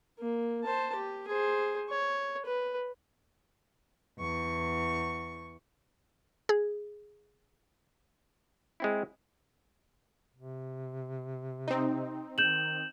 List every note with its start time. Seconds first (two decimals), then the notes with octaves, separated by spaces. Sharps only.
0.19 A#3
0.64 C5 A5
0.95 G4
1.28 G#4 C5
1.90 C#5
2.46 B4
4.19 E2 C#6
6.49 G#4
8.80 G#3 C4 E4
10.36 C3
11.68 C4 D#4
12.38 D#3 G6 E7 F#7